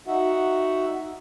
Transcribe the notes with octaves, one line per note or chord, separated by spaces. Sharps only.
D#4 F#4 E5 F#5